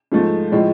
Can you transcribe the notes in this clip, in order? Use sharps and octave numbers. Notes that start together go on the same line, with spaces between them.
G#2 F3 A3
A2 F3 G#3